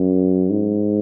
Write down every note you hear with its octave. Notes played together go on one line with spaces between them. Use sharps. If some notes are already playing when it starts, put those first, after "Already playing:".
Already playing: F#2
G#2